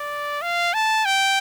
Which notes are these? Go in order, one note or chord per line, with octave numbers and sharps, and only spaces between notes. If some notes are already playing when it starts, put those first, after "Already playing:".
Already playing: D5
F5
A5
G5